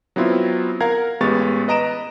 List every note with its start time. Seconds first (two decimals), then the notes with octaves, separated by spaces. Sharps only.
0.16 F#3 B3 C4 E4 F4
0.81 A#4 F5 F#5 A#5 G#6
1.20 A1 G#3 B3 G4 C#6 A6
1.68 B4 D#5 A#5 D7 E7